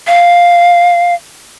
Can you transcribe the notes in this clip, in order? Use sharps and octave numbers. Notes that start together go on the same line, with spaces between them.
F5